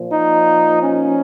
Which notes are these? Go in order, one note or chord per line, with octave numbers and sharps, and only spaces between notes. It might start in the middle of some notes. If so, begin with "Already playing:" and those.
Already playing: A#2 F3
D#4
C#4